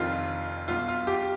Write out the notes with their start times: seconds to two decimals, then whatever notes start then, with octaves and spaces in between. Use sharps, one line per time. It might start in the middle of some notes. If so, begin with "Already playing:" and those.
Already playing: F1 F2 D#3 F4
0.68 B1 B2 F4
0.88 F4
1.07 G4